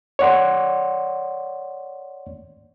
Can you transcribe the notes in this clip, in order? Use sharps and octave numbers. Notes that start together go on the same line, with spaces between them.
C#5 D5 F#5 C6